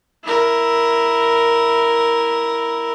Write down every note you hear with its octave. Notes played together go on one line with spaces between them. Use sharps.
E4 A#4